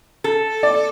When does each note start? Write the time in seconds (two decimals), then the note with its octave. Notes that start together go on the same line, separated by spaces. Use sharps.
0.24 A4
0.63 D5